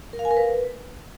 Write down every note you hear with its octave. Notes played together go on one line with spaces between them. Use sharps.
A#4
F5
G#5
A#4
B4